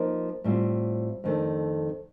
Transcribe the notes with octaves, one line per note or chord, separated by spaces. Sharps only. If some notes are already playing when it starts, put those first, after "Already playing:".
Already playing: F3 A#3 D#4 A#4
A2 G3 C4 F4
F2 D#3 A3 D4 A4